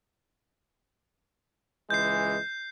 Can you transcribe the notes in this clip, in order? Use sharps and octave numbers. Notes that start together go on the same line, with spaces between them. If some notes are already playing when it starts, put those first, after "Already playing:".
C#2 E3 G#3 G6 C7